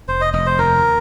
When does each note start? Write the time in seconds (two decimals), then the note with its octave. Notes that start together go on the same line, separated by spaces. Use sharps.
0.08 F1 C5
0.21 D#5
0.33 F1 D#5
0.46 C5
0.58 D#2 A#4